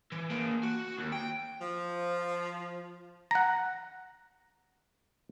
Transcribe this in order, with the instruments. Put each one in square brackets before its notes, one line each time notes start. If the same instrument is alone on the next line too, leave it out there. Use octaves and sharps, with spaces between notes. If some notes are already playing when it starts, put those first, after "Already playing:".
[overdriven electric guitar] E3
A#3 G#4
F#4
D#2
G5
[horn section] F3
[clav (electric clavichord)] F#5 A#5